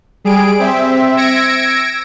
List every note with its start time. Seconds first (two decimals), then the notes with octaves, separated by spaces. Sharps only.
0.24 G3 G#4 D7
0.59 C4 E5
1.17 E6 G#6 A#6 C#7 D7